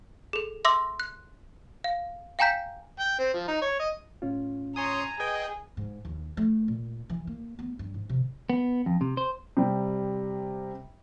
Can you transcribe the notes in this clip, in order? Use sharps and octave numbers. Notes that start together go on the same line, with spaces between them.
G#4 A4
E5 C6 D6 E6 A#6
F#6
F5
F5 G5 G#5 A#5 G6 B6
G5
C4
F3
D#4
C#5
D#5
A2 C#4 F4
C#5 G#5 A#5 C6 D#6
G#4 B4 D#5 G5 G#6
G#2
D#2
A3
A#2
E3
A#3
B3
G2
G#2
C3
B3
F2
C3
C5
C3 G3